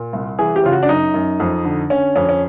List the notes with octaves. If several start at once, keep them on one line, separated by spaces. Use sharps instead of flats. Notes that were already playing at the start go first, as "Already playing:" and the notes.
Already playing: A#2
C2
E3 G#4
G4
C#3 F4
F#4
D4
F#2 D#4
F#2
F2
D3
D3 C#4
F2 C#4
C#4